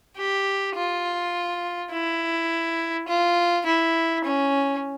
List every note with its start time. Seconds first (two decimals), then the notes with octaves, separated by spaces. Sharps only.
0.17 G4
0.75 F4
1.92 E4
3.08 F4
3.66 E4
4.24 C#4